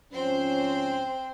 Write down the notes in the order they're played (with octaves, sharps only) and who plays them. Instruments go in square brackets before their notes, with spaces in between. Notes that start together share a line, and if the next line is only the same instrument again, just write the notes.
[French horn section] G#2 F3 C#4 [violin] C4 G5 [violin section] C5